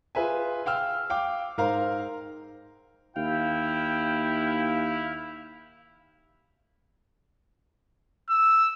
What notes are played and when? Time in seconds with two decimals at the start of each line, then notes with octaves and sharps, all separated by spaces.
0.15 F4 G#4 B4 E5 G#5
0.66 F5 G5 E6 F6
1.10 F5 G5 D6
1.58 G#2 A#4 C5 F5 A#5
3.16 D#2 E4 F5 G5
8.30 E6